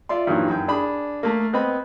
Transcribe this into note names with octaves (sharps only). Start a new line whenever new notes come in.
F4 D5 E5 C6
G2 A#2 D#3 E3 F#3
F#2 G5
D4 G#4 B5
A3 A#3
B3 C4 D#5 B5